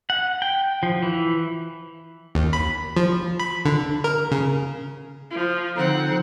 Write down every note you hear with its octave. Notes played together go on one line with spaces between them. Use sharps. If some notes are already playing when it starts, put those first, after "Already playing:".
F#5
G5
F3
E3
D#2
B5
F3
B5
D3
A#4
C#3
F3
D3 F3 C4 D#4 F#5